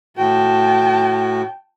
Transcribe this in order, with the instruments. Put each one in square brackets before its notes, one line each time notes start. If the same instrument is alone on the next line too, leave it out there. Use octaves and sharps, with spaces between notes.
[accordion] A2 F#4 [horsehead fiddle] G5 A5